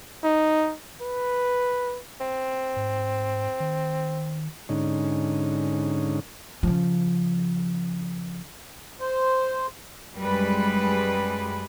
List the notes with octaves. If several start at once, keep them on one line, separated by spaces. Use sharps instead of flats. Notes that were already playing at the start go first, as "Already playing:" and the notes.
D#4
B4
C4
G#2
D#3
G#2 D3 C#4 D#4
C#3 F3
C5
F#2 G3 G#3 B4